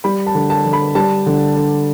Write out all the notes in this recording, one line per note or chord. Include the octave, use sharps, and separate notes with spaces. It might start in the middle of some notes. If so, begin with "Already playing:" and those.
G3 B5
A5
D3
A5
D3
B5
G3 A5
D3
D3